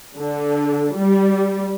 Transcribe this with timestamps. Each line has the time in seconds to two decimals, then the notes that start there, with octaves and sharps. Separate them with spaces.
0.16 D3
0.94 G3